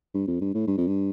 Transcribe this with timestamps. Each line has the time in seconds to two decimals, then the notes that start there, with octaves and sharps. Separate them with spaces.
0.14 G2
0.27 F2
0.41 G2
0.54 A2
0.67 G2
0.78 F2
0.87 G2